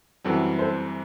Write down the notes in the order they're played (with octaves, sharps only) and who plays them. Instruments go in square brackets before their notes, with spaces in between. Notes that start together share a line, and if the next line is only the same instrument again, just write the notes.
[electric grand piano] F#2 E3 G3 C4 [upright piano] F#4 A4
[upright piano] A4 C5